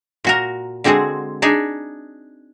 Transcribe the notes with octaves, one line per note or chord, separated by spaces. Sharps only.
A#2 F#4 A#4
D3 G#3 C4 F#4 G#4
D4 D#4 G#4